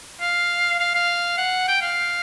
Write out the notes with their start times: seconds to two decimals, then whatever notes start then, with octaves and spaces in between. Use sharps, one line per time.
0.21 F5
0.80 F5
0.95 F5
1.38 F#5
1.68 G5
1.82 F5